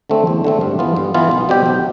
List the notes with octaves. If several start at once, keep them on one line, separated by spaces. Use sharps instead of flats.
D3 A3 C4
E2
D3 A3 C4
G2
E3 B3 F4
G2
E3 B3 F4
B1
B2 G3 C4 G4
B1